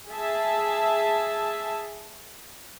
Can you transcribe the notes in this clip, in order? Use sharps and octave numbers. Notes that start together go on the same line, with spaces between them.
G#4 E5 A5